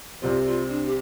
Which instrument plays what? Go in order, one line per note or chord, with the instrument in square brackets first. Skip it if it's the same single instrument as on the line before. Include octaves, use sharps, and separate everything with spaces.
[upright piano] C2 C3 G3 C4 [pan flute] F4
[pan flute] F4
D4
G4